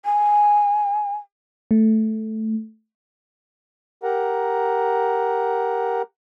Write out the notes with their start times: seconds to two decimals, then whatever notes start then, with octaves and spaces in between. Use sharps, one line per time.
0.05 G#5
1.71 A3
4.03 G4 A#4 F#5 A#5